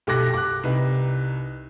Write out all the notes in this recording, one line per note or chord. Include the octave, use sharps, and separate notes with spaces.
B1 G4 A4 D6 F#6 A#6
D6 F#6
C2 D#4 B4